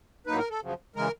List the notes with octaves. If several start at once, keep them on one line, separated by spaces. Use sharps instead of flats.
A2 F#3 A#3 D#4 B4
A#4
A4
F#2 C#3 F3
C#3 E3 G#3 A#4